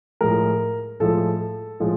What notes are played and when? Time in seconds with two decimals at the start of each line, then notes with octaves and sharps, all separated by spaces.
0.21 A2 F3 G#3 A#4
1.00 A2 F3 G#3 A4
1.80 A2 F3 G#3